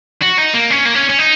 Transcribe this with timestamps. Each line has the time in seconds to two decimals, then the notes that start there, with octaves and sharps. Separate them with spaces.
0.22 F#4
0.38 D#4
0.54 A#3
0.70 C#4
0.85 A#3
0.95 C#4
1.09 C#4
1.19 D#4